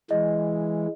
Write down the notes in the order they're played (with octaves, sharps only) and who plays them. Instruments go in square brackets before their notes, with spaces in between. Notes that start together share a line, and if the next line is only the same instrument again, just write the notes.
[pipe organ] E3 G#3 [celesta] D#5